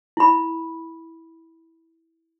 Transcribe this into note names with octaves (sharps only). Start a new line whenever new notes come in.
E4 B5